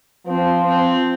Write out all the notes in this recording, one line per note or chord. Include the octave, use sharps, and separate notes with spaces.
F3 C4
C4